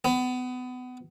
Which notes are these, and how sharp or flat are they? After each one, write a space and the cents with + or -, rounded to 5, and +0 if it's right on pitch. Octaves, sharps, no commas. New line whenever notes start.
B3 +30